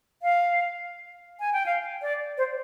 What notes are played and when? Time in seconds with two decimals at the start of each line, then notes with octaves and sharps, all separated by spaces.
0.22 F5
1.40 G#5
1.53 G5
1.66 F5
2.02 D5
2.38 C5